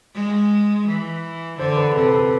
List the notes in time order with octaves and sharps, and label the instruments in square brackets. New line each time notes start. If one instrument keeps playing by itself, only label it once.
[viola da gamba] G#3
E3
[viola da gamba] D3 [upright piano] C5
[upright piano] B4
[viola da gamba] C3 [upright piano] A4
[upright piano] B4
A4